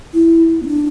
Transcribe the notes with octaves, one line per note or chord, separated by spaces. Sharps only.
E4
B3
D4